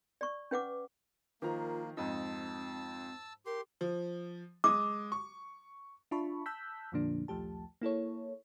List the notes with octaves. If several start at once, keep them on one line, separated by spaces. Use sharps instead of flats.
D5 C#6
C#4 B4 F#5 D6
D#3 F3 A#3 F4 A#5
F2 G#2 C4 D#4 A5 E6
G4 A#4 C6
F3
G#3 D6 D#6
C#6
D4 F4 E5 A5 B5 C#6
A5 E6 F#6 G6 B6
F2 A#2 D3 F3 A#3 D4
A#1 D#2 F3 A3 G4 A5
A#3 E4 A4 C#5